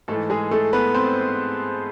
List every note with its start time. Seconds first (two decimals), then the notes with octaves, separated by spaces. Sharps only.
0.08 G#2 E3 A3 A4
0.30 G#3 G#4
0.51 A3 A4
0.73 B3 B4
0.94 C4 C5